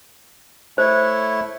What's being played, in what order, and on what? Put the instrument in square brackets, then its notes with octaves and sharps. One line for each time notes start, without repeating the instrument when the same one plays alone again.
[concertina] A3 E4 C#5 [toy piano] C5